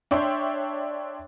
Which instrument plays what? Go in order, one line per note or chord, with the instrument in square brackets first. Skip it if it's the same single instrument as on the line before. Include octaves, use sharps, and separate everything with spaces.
[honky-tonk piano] D4 C#5 E5 G5 C6